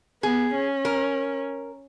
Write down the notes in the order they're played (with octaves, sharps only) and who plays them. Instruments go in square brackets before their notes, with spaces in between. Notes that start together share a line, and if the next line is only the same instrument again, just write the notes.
[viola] B3 [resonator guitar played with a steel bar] G#4
[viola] C#4
[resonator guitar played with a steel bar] A#4